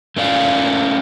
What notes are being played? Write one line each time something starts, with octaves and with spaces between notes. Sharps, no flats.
A3 C#4 A#4 D5 F5